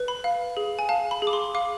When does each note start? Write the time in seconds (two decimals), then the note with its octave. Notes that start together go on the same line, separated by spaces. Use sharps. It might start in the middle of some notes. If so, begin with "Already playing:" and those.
Already playing: B4
0.08 B5
0.24 F5
0.57 G#4
0.79 G#5
0.89 F5 A5
1.11 B5
1.22 G#4 D6
1.33 C6
1.55 F5 D6